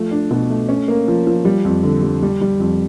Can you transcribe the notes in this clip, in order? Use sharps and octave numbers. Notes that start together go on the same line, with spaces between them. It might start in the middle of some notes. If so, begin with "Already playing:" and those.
Already playing: F3 A3
D4
B2
A3
C#4
A#3
F3
F3
G3
F2
D3
G3
G3
G3
F2